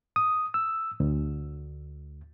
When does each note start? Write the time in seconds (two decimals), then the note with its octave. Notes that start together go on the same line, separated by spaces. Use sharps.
0.16 D#6
0.54 E6
1.00 D2